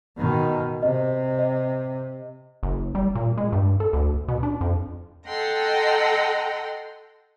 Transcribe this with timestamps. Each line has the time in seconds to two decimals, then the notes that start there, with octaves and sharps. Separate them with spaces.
0.17 B2 D#3
0.83 C3 D#5
1.39 D#5
2.63 F#1
2.95 G3
3.15 A#2
3.37 G#3
3.52 G2
3.80 A4
3.93 D2
4.28 B2
4.43 D4
4.61 F2
5.27 A4 D#5 F#5 G5 A#5 C6